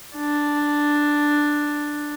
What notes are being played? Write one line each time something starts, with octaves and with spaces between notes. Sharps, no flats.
D4